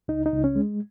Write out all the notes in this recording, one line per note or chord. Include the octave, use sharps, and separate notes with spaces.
C#2 D#4
D#4
C#2
C#4
G#3